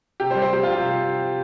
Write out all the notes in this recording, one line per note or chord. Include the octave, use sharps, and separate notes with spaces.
C3 G4
C5
G3
C5
G3 G4
C3 F4
C3 G4